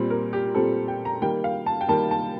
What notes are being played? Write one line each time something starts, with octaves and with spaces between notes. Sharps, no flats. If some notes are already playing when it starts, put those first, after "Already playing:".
Already playing: A#2 G3 C4
A#4
G4
A#2 G3 C4 A4
G5
A#5
D#3 G3 A#3 G5
F5
A5
G5
D#3 G3 A#3 A5
A5